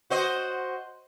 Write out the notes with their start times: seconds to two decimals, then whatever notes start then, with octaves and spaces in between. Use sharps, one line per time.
0.10 F#4 C5 D#5